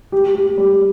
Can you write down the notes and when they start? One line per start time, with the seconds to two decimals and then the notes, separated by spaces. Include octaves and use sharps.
0.12 G4
0.35 G4
0.58 G3